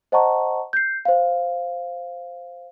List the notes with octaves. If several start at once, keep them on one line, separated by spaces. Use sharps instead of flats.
C5 D#5 F#5 A5 A#5 C#6
G6 C7
C5 F5